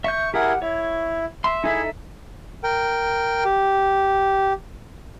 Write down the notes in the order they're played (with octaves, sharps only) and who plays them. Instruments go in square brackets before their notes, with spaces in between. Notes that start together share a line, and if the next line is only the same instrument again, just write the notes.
[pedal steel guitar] E5 G6 [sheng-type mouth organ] C#6
[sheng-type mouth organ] E4 G#4 A#4 [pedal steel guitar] G4 F#5
[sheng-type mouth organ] E4 [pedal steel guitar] C#5
[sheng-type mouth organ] E5 [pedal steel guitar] C6
[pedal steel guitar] D#4 A4 E5 [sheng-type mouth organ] E4 G#4
[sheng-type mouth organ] A#4 G5
G4